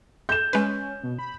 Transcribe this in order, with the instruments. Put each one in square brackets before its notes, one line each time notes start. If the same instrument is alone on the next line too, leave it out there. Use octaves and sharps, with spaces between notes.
[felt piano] G6 E7
[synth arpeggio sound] G#3 B4 [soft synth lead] C#4
[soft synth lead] B2
B5